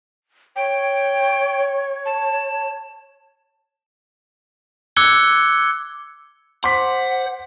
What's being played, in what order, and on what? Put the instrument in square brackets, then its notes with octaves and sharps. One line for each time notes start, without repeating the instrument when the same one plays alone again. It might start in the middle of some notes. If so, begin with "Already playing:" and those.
[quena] C#5 [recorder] G5
[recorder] A5
[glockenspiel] D6 E6 F#6 G#6 C#7 G7
[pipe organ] C5 [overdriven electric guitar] F#5 [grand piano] C6 D6 B6